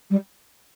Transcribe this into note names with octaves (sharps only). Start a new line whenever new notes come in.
G3